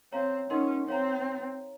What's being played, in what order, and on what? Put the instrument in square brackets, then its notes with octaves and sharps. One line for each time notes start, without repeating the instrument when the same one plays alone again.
[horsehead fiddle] C4 [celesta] C#5 F5 A#5
[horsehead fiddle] C#4 [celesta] D#4 A#4 D#5 F#5 C6
[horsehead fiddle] C4 [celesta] C#5 F5 A#5